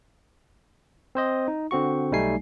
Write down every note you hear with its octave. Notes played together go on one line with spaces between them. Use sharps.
C4 C5 D#5
D#4
D3 C4 F#4 C#6
B1 G3 A3 D#4 G#5 C7